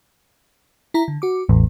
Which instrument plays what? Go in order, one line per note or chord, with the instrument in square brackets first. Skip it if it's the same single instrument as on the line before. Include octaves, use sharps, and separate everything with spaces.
[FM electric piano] E4 A#5
D3
F#4 D6
[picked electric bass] A1 [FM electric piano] E2